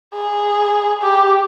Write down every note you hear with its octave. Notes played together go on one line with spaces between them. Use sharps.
G#4
G4